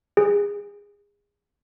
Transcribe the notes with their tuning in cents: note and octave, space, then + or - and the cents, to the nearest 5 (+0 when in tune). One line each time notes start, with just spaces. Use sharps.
G#4 -25